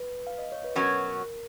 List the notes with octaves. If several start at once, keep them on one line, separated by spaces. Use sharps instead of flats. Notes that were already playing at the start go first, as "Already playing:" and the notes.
Already playing: B4
F5
D#5
C#5
B4
B2 F#3 C#4 F#4 A#4
A#4